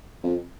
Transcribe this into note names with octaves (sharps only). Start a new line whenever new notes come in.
F2